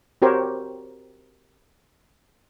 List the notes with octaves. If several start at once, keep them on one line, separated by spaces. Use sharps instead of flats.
C4 F#4 G4 A#4 C5 C#5